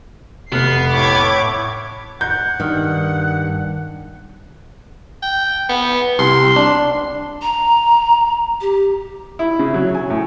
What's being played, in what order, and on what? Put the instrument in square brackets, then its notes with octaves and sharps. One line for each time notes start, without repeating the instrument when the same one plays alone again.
[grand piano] F1 F6 F#6 [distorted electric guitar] B3 [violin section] C7
[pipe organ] A2 C#5 B5 [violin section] D6 G#6
[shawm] F#5 [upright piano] G6
[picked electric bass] G2 [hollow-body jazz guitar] D#3
[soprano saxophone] G5
B3
[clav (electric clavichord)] C2 [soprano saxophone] C6
[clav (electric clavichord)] D4
[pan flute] A#5
G4
[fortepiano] E4
C#3
F#3
G#5
A2